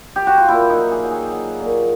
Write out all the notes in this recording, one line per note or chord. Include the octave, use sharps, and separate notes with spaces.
G4
F#4
F4
A#2 E4
D#4
F#3
G#4
F#3
G#4
F#3
A#2